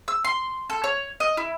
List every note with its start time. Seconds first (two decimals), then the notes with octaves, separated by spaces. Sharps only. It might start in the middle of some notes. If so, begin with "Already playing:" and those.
0.08 E6
0.24 C6
0.70 A4
0.84 C#5
1.20 D#5
1.37 E4